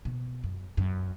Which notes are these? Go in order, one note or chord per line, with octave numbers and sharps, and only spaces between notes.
B2
F#2
F#2